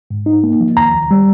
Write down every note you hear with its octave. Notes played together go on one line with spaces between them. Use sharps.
G#2
D#4
A#3
F3
D#2 A#5
D#2
G3